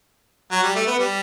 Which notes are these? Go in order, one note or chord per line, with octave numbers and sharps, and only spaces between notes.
F#3
G3
A3
B3
G3